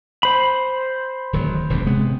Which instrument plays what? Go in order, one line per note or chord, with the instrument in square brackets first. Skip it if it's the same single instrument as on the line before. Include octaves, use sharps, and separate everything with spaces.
[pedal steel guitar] C5 B5
[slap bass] D1 D#3 F#3
E1 D2 B2
C3 G#3 B3